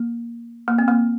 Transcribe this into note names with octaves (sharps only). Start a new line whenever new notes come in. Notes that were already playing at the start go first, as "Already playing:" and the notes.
Already playing: A#3
A#3
C4
A#3